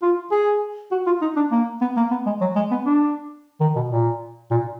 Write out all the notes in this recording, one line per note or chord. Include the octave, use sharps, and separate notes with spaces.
F4
G#4
F#4
F4
D#4
D4
A#3
B3
A#3
B3
G#3
F#3
G#3
B3
D4
D#3
B2
A#2
A#2